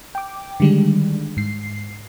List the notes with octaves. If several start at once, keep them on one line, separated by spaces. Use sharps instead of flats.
G5 D6
D3 D#3 G3 G#3 D4
G#2 C7